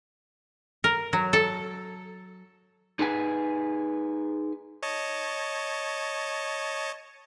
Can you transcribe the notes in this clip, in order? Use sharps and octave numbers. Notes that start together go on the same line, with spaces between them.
A#4
F#3
A4
D#4 G#4 B4 G#5
C#5 D#5 A5